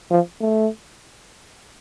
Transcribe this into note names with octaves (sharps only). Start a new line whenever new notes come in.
F3
A3